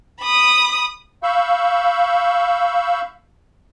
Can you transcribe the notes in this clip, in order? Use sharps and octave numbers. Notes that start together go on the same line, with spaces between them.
B5 D#6
F5 B5 C#6 E6 G6